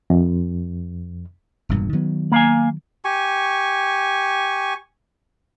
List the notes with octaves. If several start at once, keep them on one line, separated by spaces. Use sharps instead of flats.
F2
E1 G2 A#2
D#3 F#3 B3
A#3 F5 G#5
G4 G#5 C#6